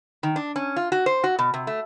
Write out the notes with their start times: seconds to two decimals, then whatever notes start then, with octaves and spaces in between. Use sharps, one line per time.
0.23 D#3
0.36 D4
0.56 C#4
0.76 F4
0.92 F#4
1.06 C5
1.24 F#4
1.39 B2
1.54 C3
1.67 A3